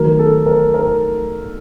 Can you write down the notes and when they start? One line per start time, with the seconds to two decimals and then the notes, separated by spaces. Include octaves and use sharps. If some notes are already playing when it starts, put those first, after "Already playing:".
Already playing: D#3 F#3 A3 A#4
0.19 A4
0.46 A#4
0.74 A#4